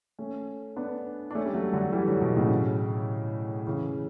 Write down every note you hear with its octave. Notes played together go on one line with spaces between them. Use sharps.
A3 C#4
B3 D4
D4
A3 C#4
G3
F#3 A3
D3 F#3
E3 G3
D3 F#3
B2
A2 C#3
C#3 E3